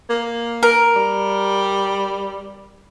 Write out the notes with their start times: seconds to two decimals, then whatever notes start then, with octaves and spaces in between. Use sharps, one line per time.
0.10 A#3
0.63 A#4
0.96 G3